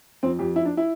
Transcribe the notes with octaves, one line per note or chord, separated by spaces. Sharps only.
F2 C4
F2 G4
F2 E4
D4
E4